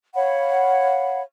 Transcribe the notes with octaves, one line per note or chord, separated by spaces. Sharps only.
C#5 F5 F#5 B5